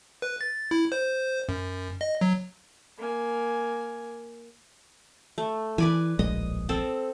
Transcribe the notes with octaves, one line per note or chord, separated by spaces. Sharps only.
B4
A6
E4
C5
F#2
D#5
F#3
A#3 G#5
A3
E3 B4 D5 G#5
D1 A#1 G#3 D#5
C4 A4